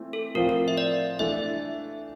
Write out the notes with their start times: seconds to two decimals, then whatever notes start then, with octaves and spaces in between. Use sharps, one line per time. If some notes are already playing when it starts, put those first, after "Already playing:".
Already playing: E3 A3 C4 E4
0.13 A4
0.35 A2 F3 C4 F4 A#4
0.49 A#4
0.68 E5
0.78 D5
1.19 E3 A3 D4 E5